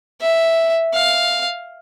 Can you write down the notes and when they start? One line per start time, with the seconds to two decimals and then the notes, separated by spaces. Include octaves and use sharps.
0.21 E5
0.93 F5